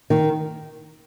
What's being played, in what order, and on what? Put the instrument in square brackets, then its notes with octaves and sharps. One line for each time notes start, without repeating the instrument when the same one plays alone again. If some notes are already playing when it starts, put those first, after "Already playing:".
[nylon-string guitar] D#3